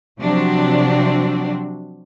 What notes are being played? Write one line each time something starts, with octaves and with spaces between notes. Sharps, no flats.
C3 F3 F#3 C4 D4 F#4